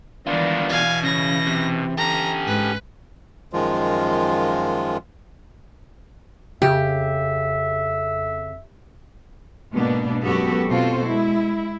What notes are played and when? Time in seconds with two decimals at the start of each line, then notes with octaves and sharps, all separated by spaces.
0.27 D#3 E3 G3 G#3 B3 D4 F4
0.69 B2 E3 F5 G#5
1.03 C#3 C#4 A#6
1.47 C3
1.97 C#4 G4 A4 A#5
2.47 G#2 B4
3.53 F#2 D#3 F3 G#3 F4
6.62 F2 C#3 G4 E5
9.72 G#2 B2 A#3 B3 D4
10.23 F#2 G#3 B3 F#4 G4 A4
10.68 B2 C4 F4 F#4 A4 C5
11.06 G#3 E4